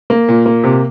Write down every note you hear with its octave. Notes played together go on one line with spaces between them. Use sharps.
A#3
A#2
A#3
C3